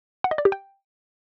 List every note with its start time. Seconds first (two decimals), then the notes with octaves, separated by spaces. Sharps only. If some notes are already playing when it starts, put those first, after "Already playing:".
0.24 F#5
0.31 D#5
0.38 D5
0.45 G4
0.52 G5